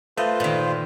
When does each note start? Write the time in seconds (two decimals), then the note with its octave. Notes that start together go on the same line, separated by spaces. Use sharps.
0.17 A3 F4 B4 C5 D#5 F5
0.40 A#2 D#3